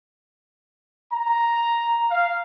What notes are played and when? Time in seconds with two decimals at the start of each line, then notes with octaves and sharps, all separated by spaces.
1.13 A#5
2.10 F5